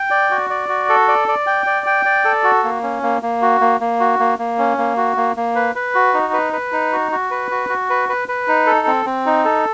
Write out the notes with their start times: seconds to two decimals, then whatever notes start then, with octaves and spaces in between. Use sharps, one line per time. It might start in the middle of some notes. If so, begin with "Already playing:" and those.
Already playing: G5
0.11 D5
0.30 F#4
0.50 D5
0.69 F#4
0.89 A4
1.08 D5
1.28 D5
1.47 G5
1.66 D5
1.86 G5
2.06 D5
2.25 A4
2.44 F#4
2.64 A#3
2.83 C#4
3.03 A#3
3.22 A#3
3.42 F#4
3.61 A#3
3.80 A#3
4.00 F#4
4.20 A#3
4.39 A#3
4.59 C#4
4.78 A#3
4.97 F#4
5.17 A#3
5.37 A#3
5.55 B4
5.75 B4
5.95 F#4
6.14 D#4
6.33 B4
6.53 B4
6.72 D#4
6.92 F#4
7.12 F#4
7.31 B4
7.51 F#4
7.69 F#4
7.90 B4
8.09 B4
8.28 B4
8.48 D#4
8.67 A4
8.87 C4
9.06 C4
9.26 D#4
9.45 A4